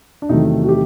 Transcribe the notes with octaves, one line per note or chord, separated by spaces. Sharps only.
D4
E2 C3 D#3 F#3 A3 D#4
F#4
G4